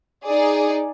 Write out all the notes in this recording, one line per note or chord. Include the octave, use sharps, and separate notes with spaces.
D#4 G#4 D5